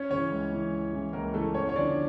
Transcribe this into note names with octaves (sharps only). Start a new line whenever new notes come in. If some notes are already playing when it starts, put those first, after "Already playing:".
Already playing: C#4 C#5
C#3 E3 C#4 C#5
C#2
C#3 E3
C#2
C#3 E3
C#2 A#3 A#4
C#3 E3 A3 A4
E2 C#4 C#5
C#5
D3 F3 D4 D5